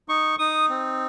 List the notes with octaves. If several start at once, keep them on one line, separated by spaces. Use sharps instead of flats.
D#4 C#6
D#4 D#6
C4